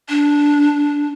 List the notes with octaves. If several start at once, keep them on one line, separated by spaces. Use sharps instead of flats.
D4